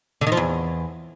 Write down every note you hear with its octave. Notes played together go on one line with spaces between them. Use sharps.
D3
D#3
F3
E2